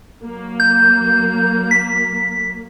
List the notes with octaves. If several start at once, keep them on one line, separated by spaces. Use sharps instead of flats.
F#3 A#3
G6
B6